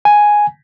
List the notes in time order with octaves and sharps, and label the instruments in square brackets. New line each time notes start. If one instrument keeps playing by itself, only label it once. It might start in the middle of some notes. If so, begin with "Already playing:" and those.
[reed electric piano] G#5